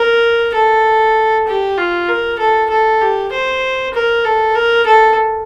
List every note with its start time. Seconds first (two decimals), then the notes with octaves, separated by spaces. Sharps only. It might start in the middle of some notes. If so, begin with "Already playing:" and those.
Already playing: A#4
0.54 A4
1.47 G4
1.78 F4
2.09 A#4
2.39 A4
2.70 A4
3.01 G4
3.33 C5
3.94 A#4
4.25 A4
4.55 A#4
4.87 A4